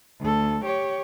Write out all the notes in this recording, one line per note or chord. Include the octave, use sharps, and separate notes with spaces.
D2 A4
G4 C#5